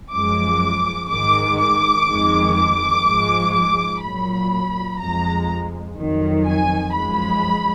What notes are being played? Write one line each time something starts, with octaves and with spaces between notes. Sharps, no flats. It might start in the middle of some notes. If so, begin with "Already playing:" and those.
F#2 F3 G#3 D6
G#2 D#3 G#3 D6
D6
F2 D#3 G#3
D6
G#2 F3 G#3
D6
A#2 F#3 B5
F2 F3 G#3 A#5
F2 D#3 F#3
G#5
F#2 F3 G#3 B5